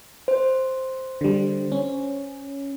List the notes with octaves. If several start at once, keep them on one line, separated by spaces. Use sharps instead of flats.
C5
D3 G3
C#4